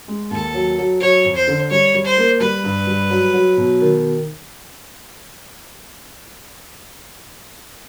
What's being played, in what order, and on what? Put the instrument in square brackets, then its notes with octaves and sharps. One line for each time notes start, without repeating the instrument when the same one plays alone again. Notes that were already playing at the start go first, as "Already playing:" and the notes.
[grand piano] G#3
[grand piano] D#2 [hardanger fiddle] A4
[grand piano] F#3
F#3
[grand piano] F#3 [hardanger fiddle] C#5
[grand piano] F2
[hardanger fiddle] C5
[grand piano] D3
[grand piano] G3 [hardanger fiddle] C#5
[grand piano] G3
[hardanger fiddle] C5
[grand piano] A#3
[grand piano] G3 [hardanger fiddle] B4
[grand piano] G2
G3
F#3
F#3
B2
D#3